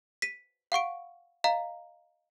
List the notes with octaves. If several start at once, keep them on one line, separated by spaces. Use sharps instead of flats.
B6 D#7
F5 F#5 C#6 D7
D#5 F5 A#5